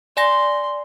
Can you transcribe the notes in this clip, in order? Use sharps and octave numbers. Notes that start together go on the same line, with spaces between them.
D5 G#5 C6 A#6